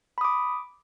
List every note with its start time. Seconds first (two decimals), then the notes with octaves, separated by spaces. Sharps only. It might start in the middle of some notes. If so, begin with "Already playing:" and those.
0.18 B5
0.21 D#6
0.25 D6